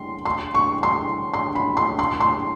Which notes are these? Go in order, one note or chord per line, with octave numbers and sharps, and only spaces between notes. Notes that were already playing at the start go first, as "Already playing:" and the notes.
Already playing: C6
C6
C#6
C6
C6
B5
C6
C6
C6